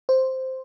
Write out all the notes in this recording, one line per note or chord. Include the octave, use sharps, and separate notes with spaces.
C5